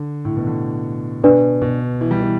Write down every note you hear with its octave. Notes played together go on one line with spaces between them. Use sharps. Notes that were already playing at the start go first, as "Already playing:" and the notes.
Already playing: D3
A2
B2
D3
B2 D4 B4 D5
B2
E3
G3
E3